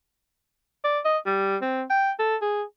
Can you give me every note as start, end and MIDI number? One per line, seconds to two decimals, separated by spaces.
0.84 1.00 74
1.05 1.18 75
1.26 1.57 55
1.62 1.83 60
1.90 2.11 79
2.19 2.36 69
2.42 2.63 68